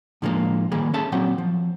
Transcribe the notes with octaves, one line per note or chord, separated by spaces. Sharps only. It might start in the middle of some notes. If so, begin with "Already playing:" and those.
A2 D3 F3 G3 G#3 A#3
D#3 G3 A#3 G#4
C#4 G#4 A4 E5 A5
A#2 F#3 C4 F#5 G5
F3